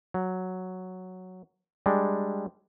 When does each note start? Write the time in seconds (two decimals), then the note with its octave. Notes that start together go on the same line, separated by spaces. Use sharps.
0.14 F#3
1.86 G3 G#3 D4